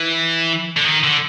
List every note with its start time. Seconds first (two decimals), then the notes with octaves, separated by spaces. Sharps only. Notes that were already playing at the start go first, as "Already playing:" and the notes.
Already playing: E3
0.77 D3
0.85 D#3
1.04 D3